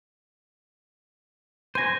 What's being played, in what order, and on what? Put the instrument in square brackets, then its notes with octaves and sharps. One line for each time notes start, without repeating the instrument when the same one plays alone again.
[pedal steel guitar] C5 G#5 [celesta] A#6 D#7